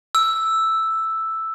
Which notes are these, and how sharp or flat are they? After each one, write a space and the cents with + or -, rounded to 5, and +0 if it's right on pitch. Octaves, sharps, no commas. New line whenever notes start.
E6 +0